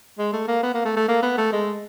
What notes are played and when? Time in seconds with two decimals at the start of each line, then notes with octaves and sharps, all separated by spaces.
0.18 G#3
0.33 A3
0.47 A#3
0.63 B3
0.74 A#3
0.85 A3
0.96 A3
1.08 A#3
1.22 B3
1.38 A3
1.52 G#3